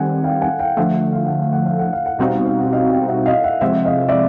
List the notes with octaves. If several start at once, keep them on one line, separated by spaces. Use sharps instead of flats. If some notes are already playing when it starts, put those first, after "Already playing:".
Already playing: D#3 G3 C4 F#5 G#5
F5 G5
F#5 G#5
F5 G5
D3 F3 A3 E5 F#5
F5
F#5
F5
F#5
F5
F#5
F5
F#5
B2 G3 C4 D#4 F#4 F5
F#5
F5
F#5
D#5 F5
F5 G5
E5 F#5
D#5 F5
E5 F#5
C3 F3 G#3 C4 E5 F#5
D#5 F5
D5 E5